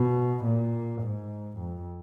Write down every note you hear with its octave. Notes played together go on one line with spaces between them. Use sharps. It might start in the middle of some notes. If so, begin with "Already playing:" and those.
Already playing: B2
A#2
G#2
F2